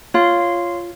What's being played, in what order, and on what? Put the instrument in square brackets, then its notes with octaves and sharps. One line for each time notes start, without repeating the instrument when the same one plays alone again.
[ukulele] F4 [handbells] C#5 F5 C6